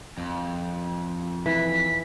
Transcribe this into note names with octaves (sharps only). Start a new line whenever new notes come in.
F2
E3 B6